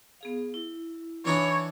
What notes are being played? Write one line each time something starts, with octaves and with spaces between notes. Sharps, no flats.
B3 G#4 F5
E4
E3 D4 D#4 C#5